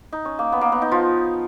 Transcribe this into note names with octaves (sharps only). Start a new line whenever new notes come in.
D#4
C#4
A#3
B3
A#3
B3
D#4
F3 F4